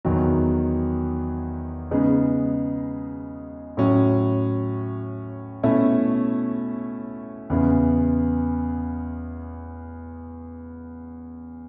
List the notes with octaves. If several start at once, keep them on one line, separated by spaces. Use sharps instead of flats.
E2 D#3 F#3
C#3 G#3 B3 D#4
A2 F#3 C#4
B2 A3 C#4 E4
E2 C#3 E3 B3